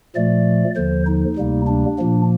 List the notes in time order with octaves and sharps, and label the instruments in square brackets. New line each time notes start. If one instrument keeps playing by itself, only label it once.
[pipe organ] A#2 F3 A3 D5
D#2 D3 F3 C5
D#4
D2 C3 G3 A#3
D4
A#2 F3 A#3